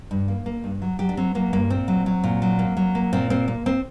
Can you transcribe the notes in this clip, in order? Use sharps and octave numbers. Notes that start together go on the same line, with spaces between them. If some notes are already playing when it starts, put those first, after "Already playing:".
G2
A#3
A#3
G2
F#3
F#3 G4
D4
F#3 C4
F#3 A#3
G2 A#3
A#2 C4
F#3
F#3
A#2
F#3
A#3
F#3
A#3
A#2 C4
A#3 C4
A#3
A#3 C4